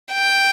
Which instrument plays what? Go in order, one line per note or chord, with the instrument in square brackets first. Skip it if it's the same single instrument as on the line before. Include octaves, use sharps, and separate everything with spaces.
[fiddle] G5